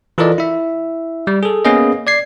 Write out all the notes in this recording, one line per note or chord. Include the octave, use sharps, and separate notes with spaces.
E3 F4 A4 A#4 D5 D#5
E4 E5
G3
G#4 A4
A#3 B3 C#4 G#4 B4 D#5
D5 G#6 C7